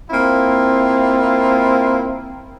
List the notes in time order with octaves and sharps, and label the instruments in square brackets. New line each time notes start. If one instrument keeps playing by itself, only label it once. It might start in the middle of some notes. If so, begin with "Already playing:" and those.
[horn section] A#3 C4 E4 F4